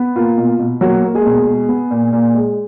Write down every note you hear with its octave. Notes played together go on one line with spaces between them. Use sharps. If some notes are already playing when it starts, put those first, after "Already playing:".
Already playing: B3
A#3 F4
B2
B2
F#3 A#3 F#4
A#3
G#3 G#4
B2
G#3
B3
A#2
A#2
G#3